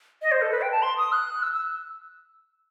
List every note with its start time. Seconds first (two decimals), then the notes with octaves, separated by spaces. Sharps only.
0.22 D#5
0.32 C5
0.42 A4
0.51 B4
0.62 G5
0.72 A5
0.82 C6
0.98 D#6
1.12 F#6
1.43 E6
1.53 E6